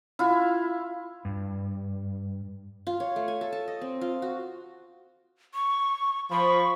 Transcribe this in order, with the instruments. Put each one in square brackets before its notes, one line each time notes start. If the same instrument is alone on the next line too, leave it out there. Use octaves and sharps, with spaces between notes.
[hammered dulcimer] E4 F4
[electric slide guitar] G2
[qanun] F4
C#5
A3
G#5
A4
A5
D#5
C4
F4
F#4
[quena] C#6
[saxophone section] F3 [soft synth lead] B5 [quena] C#6